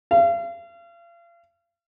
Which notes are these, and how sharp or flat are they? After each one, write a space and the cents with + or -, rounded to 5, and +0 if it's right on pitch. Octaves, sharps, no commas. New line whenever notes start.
F5 -40